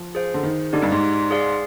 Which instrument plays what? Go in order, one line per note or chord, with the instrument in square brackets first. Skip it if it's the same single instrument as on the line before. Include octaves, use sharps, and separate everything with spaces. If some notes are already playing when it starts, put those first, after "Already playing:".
Already playing: [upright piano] F3
[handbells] G#4 C5 F5
[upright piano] D3
D#3
[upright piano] D3 [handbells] D#4 G4 D5
[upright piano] G2
G#2
[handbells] G#4 D5 F5